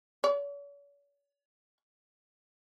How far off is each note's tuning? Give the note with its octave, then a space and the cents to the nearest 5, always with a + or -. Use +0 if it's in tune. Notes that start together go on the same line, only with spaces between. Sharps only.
C#5 +45